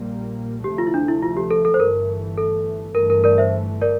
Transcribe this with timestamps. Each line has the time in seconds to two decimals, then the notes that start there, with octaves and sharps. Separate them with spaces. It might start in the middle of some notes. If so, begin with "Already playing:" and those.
Already playing: A#1 A#2 G3 A#3
0.64 D2 C3 F3 A3 G4
0.78 F4
0.87 E4
0.94 D4
1.08 E4
1.22 F4
1.37 G4
1.51 A4
1.65 A4
1.74 C5
1.80 G1 G2 E3 A3 A#4
2.38 A4
2.95 G1 G2 E3 A3 A#4
3.10 A#4
3.24 A#4 D5
3.38 C5 E5
3.82 A#4 D5